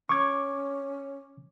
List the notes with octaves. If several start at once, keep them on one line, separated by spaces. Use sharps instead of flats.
C#4 C#6 D6 G#6